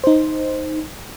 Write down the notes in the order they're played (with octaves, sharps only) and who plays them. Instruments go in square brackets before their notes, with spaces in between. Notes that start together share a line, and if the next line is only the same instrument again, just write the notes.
[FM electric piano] D#4 C5